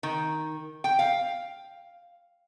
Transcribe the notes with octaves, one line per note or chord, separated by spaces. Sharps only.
D#3
G5
F5